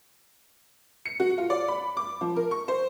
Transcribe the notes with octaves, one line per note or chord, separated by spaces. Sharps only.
C#7
F#4
F4
D5
B5
D6
F3
A#4
C#6
C5